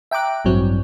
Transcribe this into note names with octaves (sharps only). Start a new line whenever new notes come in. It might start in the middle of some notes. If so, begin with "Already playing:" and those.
E5 G5 A#5 D6 F#6
A1 G2 F#3 C4